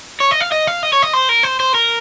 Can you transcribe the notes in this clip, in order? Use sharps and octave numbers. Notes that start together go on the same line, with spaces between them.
C#5
D#5
F5
D#5
F5
D#5
C#5
D#5
C5
A#4
C5
C5
A#4